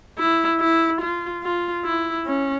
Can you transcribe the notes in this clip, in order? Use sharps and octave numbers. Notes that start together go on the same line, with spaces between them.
E4
E4
F4
F4
E4
C#4